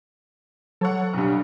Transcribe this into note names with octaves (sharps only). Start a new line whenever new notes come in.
F#3 A4 C#5 F#5
B1 G2